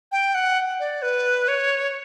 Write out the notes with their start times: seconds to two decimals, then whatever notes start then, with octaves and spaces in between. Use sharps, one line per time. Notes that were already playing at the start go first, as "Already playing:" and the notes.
0.12 G5
0.35 F#5
0.80 D5
1.02 B4
1.48 C#5